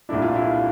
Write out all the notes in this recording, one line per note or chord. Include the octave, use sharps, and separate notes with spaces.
C2 A#2 A3 D4 E4
F4
E4
F4